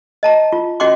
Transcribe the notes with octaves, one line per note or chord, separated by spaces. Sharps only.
D#5 A5 A#5
F4
C#4 F#4 D#5 G5 C6 D6